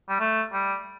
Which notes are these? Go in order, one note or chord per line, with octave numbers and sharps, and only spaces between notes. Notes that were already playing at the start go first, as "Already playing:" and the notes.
G3
A3
G3